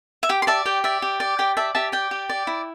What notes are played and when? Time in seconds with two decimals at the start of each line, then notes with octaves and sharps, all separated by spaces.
0.23 E5
0.29 G4 G5
0.42 C6
0.47 D5 E5 A5
0.65 G4 G5
0.84 D5 E5
1.02 G4
1.20 D5
1.39 G4 G5
1.57 D5 E5 A5
1.75 G4 E5 A5
1.92 D5 G5
2.11 G4
2.29 D5
2.47 E4